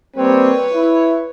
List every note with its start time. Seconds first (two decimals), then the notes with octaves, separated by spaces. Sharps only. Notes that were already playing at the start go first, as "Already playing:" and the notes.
0.17 G3 A#3 C4 B4 C#5
0.73 E4